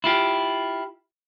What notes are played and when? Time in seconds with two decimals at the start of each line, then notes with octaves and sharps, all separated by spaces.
0.04 E4 F4 G4